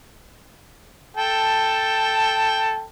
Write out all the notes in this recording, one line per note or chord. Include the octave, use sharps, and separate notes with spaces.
A4 G5 A5